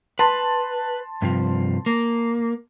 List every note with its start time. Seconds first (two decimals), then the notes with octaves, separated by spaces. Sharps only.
0.19 B4 A5 C6
1.22 G2 C3 F3
1.86 A#3